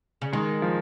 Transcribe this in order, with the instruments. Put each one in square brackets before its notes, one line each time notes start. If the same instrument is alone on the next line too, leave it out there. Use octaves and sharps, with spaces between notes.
[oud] C#3
[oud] D#3 [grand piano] G#3
[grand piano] F3